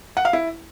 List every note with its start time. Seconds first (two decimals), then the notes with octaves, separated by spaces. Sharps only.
0.17 F#5
0.25 F5
0.33 E4